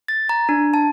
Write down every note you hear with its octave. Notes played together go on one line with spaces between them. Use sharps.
A6
A#5
D4
A5